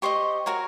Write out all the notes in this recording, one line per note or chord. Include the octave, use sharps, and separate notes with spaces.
G4 C5 D#5 C#6
F#4 A#4 C#5